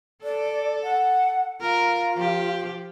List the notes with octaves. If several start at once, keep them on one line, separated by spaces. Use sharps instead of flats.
A4 D5
F#5
F4 A#4
F3 G4